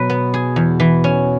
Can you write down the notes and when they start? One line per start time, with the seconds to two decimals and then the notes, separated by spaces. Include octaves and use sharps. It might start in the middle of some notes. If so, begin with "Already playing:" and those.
Already playing: B2 F#3 B4
0.10 B3
0.34 G#4
0.56 E2
0.80 E3
1.04 C#4